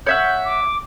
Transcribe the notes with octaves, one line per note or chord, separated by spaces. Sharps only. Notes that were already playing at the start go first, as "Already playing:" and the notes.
C#5 E5 F#5 G6
D6